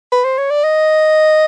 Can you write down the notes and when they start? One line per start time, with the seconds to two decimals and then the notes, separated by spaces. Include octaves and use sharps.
0.12 B4
0.25 C5
0.38 C#5
0.50 D5
0.64 D#5